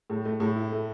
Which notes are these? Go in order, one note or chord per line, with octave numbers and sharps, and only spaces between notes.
A2
A3
A2
E4
A3